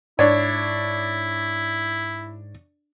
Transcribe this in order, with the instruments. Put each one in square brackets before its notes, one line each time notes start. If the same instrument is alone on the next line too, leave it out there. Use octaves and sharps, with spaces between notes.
[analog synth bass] G#2 [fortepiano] D4 C#5 [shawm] E4